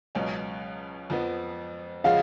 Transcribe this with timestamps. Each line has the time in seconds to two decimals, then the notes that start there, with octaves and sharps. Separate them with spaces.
0.15 C#2 B2 F#3 C#4
1.10 F2 F3 B3
2.04 C#3 F3 G#3 C#4 F#4 F5